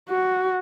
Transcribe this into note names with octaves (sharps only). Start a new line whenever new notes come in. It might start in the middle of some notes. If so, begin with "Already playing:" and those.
F#4